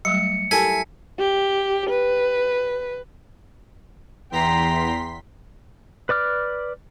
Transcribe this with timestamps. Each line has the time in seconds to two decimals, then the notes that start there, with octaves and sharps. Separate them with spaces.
0.05 F#3 G3 A3 C#7
0.51 E4 G4 A4 A#4 G#5 A5 B6
1.19 G4
1.90 B4
4.31 E2 G5 A#5 C6 B6
6.09 B4 D5 D6 F6